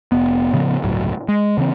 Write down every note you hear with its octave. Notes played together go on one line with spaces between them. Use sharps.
F1 B3
A2 C#3 F3 B3
G1 C#2 A2 F#3
G#3
C#3 E3 C4